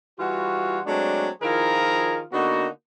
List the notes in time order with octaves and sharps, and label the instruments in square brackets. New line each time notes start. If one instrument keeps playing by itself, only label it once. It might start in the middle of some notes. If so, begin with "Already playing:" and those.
[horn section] E3 G3 F4 F#4
F#3 G#3 A3 C4 D4
D#3 F3 E4 F4 G#4 A#4
D3 A#3 B3 D#4 F#4